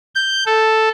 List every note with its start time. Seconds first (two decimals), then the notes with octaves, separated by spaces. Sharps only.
0.15 G6
0.46 A4